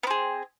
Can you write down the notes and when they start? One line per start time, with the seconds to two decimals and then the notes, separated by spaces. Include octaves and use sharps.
0.03 B3
0.07 C4
0.10 G#4